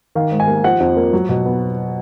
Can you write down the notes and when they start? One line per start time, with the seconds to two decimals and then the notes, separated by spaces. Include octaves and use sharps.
0.15 D#3 F5
0.32 G#2
0.40 G#5
0.48 A#3
0.64 F3 F#5
0.80 F2
0.97 A#3
1.13 F#3
1.29 B2
1.45 B3